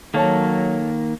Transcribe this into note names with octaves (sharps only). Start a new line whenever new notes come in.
D#3 F#3 A#3 A4 C#5 A5